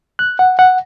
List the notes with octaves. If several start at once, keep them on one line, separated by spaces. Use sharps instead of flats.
F#6
F#5
F#5